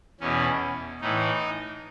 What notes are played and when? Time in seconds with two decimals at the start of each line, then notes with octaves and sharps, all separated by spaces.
0.20 E2 B2 C#4
1.01 A2 E3 D#4